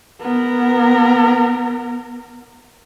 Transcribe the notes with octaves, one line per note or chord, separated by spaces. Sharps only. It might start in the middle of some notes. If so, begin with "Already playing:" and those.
B3 A#4